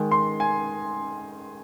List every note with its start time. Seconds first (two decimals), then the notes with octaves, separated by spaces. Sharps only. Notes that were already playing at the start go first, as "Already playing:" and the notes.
Already playing: D#3 G#3
0.11 C6
0.40 G#5